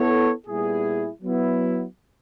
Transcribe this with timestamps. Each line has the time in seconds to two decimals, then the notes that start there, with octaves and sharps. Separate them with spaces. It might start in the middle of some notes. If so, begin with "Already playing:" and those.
Already playing: B3 E4 A4 C#5
0.47 A#2 G3 B3 E4 G#4
1.23 F#3 B3 E4